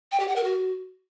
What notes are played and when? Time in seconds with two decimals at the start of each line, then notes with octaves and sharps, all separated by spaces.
0.12 G5
0.20 G4
0.28 F#5
0.36 A#4
0.44 F#4